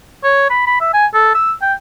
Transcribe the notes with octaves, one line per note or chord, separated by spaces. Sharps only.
C#5
B5
B5
E5
G#5
A4
E6
G5